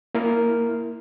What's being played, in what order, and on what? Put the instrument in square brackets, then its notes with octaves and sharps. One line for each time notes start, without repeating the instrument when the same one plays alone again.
[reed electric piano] A#3 E4 A#4 F6